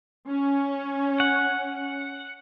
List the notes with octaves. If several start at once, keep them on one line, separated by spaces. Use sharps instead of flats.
C#4
F#5